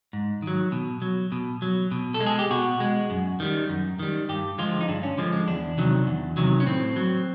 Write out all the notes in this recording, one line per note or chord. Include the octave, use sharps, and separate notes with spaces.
G#2
D#3 F#3
B2
F#3
B2
F#3
B2
A4
G#3
G#4
G4
B2 F#4
G#3
F#2
D#3 G3
F#2
D#3 G3
G2 G4
D3 F3 G#3 F4
D#4
G2 D4
C#4
D3 F3 G#3
G#3
E2 D4
C3 D#3 F#3
E2
C3 D#3 F#3
C#4
A2 C4
F#3